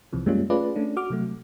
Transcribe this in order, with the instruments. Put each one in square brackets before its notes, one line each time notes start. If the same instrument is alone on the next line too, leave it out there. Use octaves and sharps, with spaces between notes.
[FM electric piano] C2 C3 E3 F3
F#2 G3 G#3 A#3 C#4 F4
A3 C#4 F4 G#4 B4 D5
A3 C#4 D4
F#4 D6 F6
C3 F#3 A3